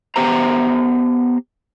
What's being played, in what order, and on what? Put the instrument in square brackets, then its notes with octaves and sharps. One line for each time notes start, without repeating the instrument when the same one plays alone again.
[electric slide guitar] B3 G4 C5 A#5